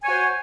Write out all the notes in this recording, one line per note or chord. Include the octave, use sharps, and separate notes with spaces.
F#4 C5 C#5 G#5